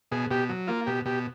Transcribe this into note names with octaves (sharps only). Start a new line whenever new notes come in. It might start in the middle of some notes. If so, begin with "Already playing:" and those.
B2 G#4
B2 G4
F#3
A#3 F4
B2 G4
B2 G4